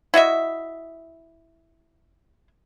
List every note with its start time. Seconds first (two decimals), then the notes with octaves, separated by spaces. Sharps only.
0.14 E4 F#4 D#5 E5